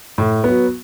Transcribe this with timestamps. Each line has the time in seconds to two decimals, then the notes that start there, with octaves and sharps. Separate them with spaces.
0.18 A2
0.44 F#3 B3